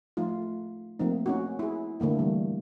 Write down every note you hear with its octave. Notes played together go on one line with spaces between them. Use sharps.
F3 A3 D#4 F4
F3 A3 A#3 C4 D#4
C#4 D#4 F#4
E4 G#4
D3 A3 A#3 E4
E3 G3 G#3